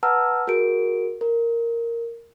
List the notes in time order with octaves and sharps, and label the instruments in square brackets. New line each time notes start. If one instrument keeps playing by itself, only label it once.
[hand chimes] B4 F#5 A5 A#5 E6 F6
F#4 G#4 A#4 D7
A#4